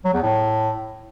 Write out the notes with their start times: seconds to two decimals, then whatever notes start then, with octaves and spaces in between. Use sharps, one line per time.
0.05 F#3
0.14 E2
0.22 A2